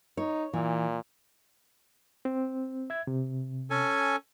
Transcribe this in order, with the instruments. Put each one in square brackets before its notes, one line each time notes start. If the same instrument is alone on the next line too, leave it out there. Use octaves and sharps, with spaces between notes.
[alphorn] D#4 [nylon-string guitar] C#5
[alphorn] A#2 [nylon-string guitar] E3
[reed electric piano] C4
E5 G#6
C3
[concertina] C#4 A4 G#5